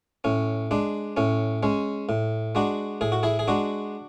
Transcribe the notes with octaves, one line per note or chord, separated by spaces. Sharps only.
A2 C#4
G#3 D4
A2 C#4
G#3 C#4
A2
G#3 D4 F#4
A2 G#4
F#4
E4 G#4
G#4
G#3 D4 F#4